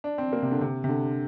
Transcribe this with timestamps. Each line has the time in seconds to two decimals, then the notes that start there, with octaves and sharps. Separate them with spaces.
0.04 D4
0.18 C4
0.33 A#3
0.42 C3
0.51 D3
0.61 C3
0.84 C3
0.89 D3